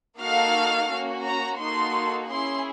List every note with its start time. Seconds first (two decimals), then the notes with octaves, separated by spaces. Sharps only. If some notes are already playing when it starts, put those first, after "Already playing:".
0.18 A#3 D#4 F#4 A4 F5
0.89 A#3 C#4 F#4
1.24 A#5
1.58 A#3 D#4 F#4 A4 C6
2.29 C#4 E4 G#4 C6